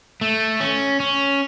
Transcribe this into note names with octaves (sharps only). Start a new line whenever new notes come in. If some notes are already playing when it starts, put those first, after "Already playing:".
A3
C#4
C#4